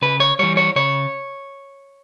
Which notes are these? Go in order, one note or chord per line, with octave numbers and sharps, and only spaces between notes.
C#3 B4
C#5
E3 G3 C#5
C#5
C#3 C#5